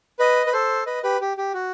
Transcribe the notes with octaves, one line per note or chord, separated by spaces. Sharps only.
B4 D#5
B4
A4 C5
B4 D#5
G4 B4
G4
G4
F#4